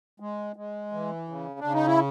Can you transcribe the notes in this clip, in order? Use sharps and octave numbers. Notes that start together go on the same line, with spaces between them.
G#3
G#3
E3
C#3
C#3 D4
D#4
E4